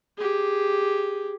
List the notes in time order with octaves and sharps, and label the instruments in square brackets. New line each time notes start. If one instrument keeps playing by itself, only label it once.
[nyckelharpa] G4 G#4